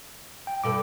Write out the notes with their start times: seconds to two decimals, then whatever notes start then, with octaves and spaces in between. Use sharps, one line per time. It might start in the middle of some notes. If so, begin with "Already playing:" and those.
0.47 G5
0.64 G2 B2 A4 D6